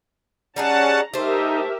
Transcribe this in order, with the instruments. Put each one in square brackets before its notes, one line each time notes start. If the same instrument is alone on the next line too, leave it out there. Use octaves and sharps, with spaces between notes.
[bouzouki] G3 D#4 G#4 [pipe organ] C#4 F#5 A5 [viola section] A#5
[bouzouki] A3 C5 [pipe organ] D#4 [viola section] G4 A#4 E5